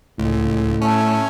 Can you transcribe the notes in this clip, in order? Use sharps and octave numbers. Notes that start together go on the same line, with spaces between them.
C#2 A2
A3 C#4 A5